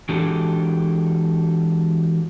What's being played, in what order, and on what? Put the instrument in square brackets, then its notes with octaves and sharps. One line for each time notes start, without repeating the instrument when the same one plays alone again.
[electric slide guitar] E3 G#3 D4 F#4 G4 A4